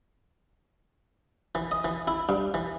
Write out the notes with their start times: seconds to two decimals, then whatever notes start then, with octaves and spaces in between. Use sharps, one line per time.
1.55 E3
1.71 D#5
1.84 E3
2.08 E4
2.29 G2
2.54 E3